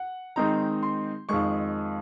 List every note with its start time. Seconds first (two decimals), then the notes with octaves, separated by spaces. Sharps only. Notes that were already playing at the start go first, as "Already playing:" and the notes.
Already playing: F#5
0.36 D#3 G#3 C4 D#4 A#5
0.83 C6
1.29 F2 D#3 G#3 C#6